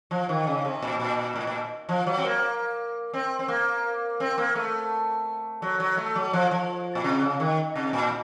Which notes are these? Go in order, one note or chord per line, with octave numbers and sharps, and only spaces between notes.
F3
D#3
C#3
C3
A#2
A#2
A2
A#2
F3
F#3
C4
A#3
C4
C4
A#3
C4
A#3
A3
F#3
F#3
A3
F#3
F3
F3
A#2
C3
C#3
D#3
C3
A#2